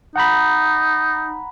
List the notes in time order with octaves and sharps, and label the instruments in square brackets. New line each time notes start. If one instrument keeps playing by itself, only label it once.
[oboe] D#4 [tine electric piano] F#5 A#5 B5